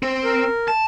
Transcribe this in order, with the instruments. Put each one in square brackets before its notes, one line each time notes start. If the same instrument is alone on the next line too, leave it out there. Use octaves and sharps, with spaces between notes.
[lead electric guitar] C4
[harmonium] A#4
[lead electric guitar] A5